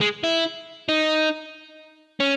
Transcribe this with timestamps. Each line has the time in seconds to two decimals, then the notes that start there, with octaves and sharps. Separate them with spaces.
0.01 G#3
0.23 E4
0.89 D#4
2.20 C#4